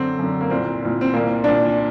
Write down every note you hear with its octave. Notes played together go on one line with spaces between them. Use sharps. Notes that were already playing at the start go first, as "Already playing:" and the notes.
Already playing: F#2 D3 C4
F#2 D3
A#3
C2 A#2 C4
C2 A#2
C4
C2 A#2 A#3
C2 A#2 D4